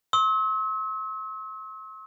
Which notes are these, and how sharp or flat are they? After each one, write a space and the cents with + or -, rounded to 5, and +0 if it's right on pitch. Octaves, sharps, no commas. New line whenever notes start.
C6 +45 E6 -40